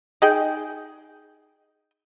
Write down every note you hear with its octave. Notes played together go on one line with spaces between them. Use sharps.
D#4 G#4 G5